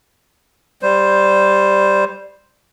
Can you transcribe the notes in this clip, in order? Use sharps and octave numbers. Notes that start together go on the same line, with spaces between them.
G3 C5